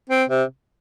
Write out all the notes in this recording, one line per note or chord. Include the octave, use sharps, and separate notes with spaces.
C4
C3